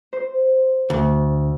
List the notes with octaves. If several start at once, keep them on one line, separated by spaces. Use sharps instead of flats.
C5
D2